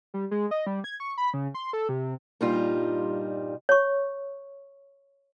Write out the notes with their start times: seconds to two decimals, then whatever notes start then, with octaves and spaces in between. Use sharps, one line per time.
0.14 G3
0.31 G#3
0.51 D#5
0.67 G3
0.84 G#6
1.00 C#6
1.18 B5
1.34 C#3
1.54 C6
1.73 A4
1.89 C3
2.41 G2 A#2 G3 D#4 F4
3.69 C#5 C#6